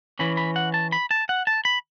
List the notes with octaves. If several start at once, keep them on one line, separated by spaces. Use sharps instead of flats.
E3 C#4 B5
B5
F#5
A5
B5
A5
F#5
A5
B5